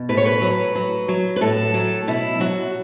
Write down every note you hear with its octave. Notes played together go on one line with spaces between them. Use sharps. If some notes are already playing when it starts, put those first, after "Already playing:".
Already playing: B2
A2 B4
C#5
B4
F#3
F#3
F#3
B4
A2 A4
F#3
B2 E4
F#3 F#4